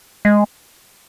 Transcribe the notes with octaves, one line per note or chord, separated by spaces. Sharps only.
G#3